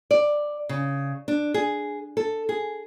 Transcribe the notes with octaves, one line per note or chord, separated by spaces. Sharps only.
D5
C#3
D4
G#4
A4
G#4